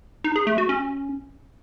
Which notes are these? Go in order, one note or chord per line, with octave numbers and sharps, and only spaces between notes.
D#4
G#4
A3
F#4
C#4